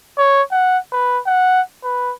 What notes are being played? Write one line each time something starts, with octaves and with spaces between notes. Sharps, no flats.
C#5
F#5
B4
F#5
B4